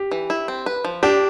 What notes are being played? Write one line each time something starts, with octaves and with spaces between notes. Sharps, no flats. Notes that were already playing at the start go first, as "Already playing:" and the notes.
Already playing: G4
E3
E4
C4
B4
F3
D4 G4